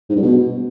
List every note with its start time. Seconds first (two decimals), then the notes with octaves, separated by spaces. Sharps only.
0.10 G#2
0.16 G2
0.22 B2